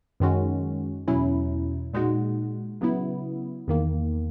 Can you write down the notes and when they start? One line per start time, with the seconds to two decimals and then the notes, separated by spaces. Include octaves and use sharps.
0.20 F#2 D#3 G#3 C#4 F#4
1.08 E2 B2 F#3 C#4 E4
1.94 A#2 G#3 D#4 F#4
2.81 C#3 F#3 B3 E4
3.68 E2 D#3 A#3